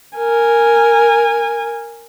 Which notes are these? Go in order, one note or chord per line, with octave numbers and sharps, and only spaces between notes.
A#4 G#5